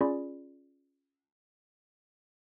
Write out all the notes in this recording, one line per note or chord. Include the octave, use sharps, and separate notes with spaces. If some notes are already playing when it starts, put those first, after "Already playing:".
C#4 F4 G#4 D5 B5